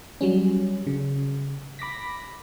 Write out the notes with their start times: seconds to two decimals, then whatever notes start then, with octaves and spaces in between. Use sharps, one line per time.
0.21 F#3 G3 C#4
0.87 C#3
1.79 B5 D6 A#6 B6